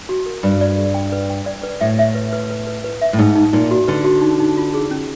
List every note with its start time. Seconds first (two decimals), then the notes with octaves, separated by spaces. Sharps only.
0.09 F#4
0.26 A#4
0.43 G2 B4
0.61 D5
0.78 G#4
0.94 G5
1.12 B4
1.30 G5
1.46 D5
1.63 B4
1.81 A2 E5
1.99 E5
2.15 B4
2.33 B4
2.51 B4
2.67 B4
2.84 B4
3.02 E5
3.13 A2
3.18 G#2 D#4
3.36 D#4
3.53 A#2 D#4
3.71 F#4
3.88 D3 B4
4.04 F#4
4.22 D#4
4.40 D#4
4.57 F4
4.74 G#4
4.91 C#4